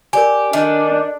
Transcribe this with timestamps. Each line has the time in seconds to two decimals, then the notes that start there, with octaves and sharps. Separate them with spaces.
0.13 G4 A#4 D5 G#5
0.53 D#3 D4